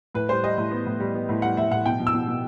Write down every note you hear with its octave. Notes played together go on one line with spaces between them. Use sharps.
A2 B4
G3 C5
G3 D#5
A2
B3
A2
G3
B3
A2
G3 F#5
A2 E5
A2 F#5
B2 G5
B2
E6
B2
B2